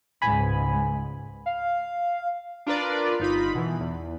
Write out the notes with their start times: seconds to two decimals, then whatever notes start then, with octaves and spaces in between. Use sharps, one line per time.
0.22 C#2 G#2 G#5 B5
1.46 F5
2.67 D4 F4 A#4 B4 D5
3.20 G1 D#4 F4 B5
3.55 B2 E3
3.80 E2